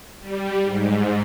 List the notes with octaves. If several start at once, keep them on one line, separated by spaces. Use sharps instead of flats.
G3
G#2